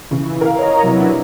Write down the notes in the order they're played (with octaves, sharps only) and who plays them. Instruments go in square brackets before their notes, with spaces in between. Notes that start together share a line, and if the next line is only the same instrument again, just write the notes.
[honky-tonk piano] C#3 [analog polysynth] E3
[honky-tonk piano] A#4 F5
[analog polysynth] C#5 D#5 A#5
[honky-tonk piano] C3 [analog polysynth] F#3 E4 B4
[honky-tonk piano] D4